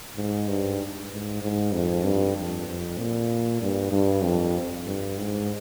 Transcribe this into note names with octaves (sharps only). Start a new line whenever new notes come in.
G#2
G2
G#2
G#2
F2
G2
F2
F2
A#2
G2
G2
F2
G2
G#2